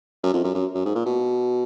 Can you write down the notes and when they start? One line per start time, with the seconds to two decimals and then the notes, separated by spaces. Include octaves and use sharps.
0.23 F#2
0.34 F2
0.44 F#2
0.55 F#2
0.75 F#2
0.85 G#2
0.95 A#2
1.06 B2